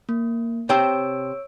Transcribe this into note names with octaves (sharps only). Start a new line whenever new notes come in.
A#3
C3 C5 C#5 G5 E6 D7